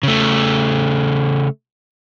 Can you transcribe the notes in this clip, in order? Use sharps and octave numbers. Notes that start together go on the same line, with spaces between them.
C#3 A3